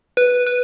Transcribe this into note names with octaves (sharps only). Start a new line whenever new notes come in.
B4
B4